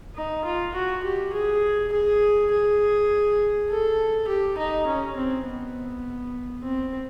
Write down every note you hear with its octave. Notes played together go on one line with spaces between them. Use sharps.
D#4
F4
F#4
G4
G#4
G#4
G#4
A4
G4
D#4
C#4
C4
B3
C4